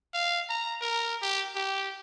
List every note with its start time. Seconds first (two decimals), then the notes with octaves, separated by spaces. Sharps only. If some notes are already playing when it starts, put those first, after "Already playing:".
0.14 F5
0.49 A#5
0.81 A#4
1.22 G4
1.55 G4